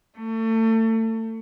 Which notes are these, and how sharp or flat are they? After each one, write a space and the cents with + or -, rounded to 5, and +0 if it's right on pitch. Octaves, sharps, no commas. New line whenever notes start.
A3 +30